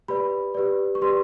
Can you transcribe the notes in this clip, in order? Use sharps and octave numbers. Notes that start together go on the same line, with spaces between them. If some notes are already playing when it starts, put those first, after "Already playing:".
G4 B4 D5 B5
G4 B4 D5
C#6
G4 B4 D5 C6